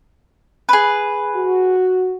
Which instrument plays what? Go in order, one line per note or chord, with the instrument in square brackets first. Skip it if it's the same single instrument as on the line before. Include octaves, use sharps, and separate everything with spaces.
[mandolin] G#4 B4
[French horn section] F#4